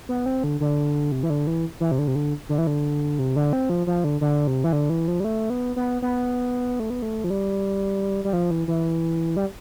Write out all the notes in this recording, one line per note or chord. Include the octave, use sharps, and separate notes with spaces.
B3
C4
D3
D3
C3
E3
D3
E3
E3
C3
D3
C3
D3
D3
E3
D3
C3
D3
C4
F3
F3
D3
D3
C3
E3
D3
E3
F3
G3
A3
B3
B3
B3
A3
B3
A3
F3
G3
G3
F3
E3
E3
G3